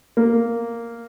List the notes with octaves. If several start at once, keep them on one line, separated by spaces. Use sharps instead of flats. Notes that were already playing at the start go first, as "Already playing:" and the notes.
A#3